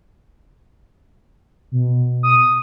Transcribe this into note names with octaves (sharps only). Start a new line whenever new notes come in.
B2
D#6